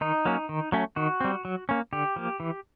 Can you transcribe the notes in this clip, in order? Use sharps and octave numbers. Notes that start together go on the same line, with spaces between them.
D#3 D#4
F#3 A#3 C#4
D#3
F#3 A3 C#4
D#3 F#4
G3 C4
F#3
A#3 C#4
D3 G4
F3 A#3
E3